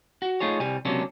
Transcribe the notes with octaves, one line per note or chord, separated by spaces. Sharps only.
F#4
A3 D#4 F4 G#4 C#5
C2 G3 G#5
C#2 C3 F#3 A#3 C#4 D4